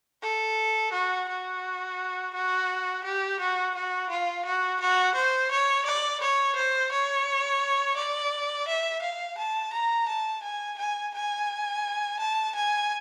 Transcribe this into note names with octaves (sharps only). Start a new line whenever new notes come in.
A4
F#4
F#4
F#4
G4
F#4
F#4
F4
F#4
F#4
C5
C#5
D5
C#5
C5
C#5
D5
E5
F5
A5
A#5
A5
G#5
G#5
G#5
A5
G#5